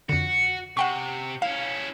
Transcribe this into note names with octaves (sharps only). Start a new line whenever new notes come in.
F2 D3 F#4
C3 F#5 G5 C#6
C#4 E4 F5